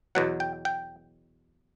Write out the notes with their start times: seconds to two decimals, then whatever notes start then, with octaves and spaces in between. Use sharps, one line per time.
0.15 E2 B2 F#3 F#5
0.40 G5
0.65 G5